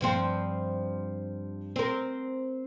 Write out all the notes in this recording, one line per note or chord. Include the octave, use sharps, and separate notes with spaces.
G2 F3 C4
C4 A#4